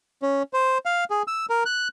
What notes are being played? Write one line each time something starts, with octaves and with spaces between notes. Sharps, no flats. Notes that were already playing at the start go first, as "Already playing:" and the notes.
C#4
C5
F5
G#4
E6
A#4
F#6